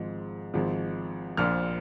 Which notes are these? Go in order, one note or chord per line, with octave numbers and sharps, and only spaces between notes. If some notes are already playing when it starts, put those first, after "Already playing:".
Already playing: G#1 G#2 F3 G#3
G#1 G#2 F3
A#1 A#2 F3 F6